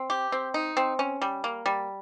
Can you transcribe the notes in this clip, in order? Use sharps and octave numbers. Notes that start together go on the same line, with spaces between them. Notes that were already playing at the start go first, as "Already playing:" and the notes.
Already playing: C4
G4
C4
D#4
C4
C#4
G3
A#3
G3